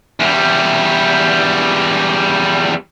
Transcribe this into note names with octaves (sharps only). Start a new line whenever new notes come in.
E2 G3